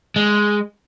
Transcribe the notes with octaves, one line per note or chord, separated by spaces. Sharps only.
G#3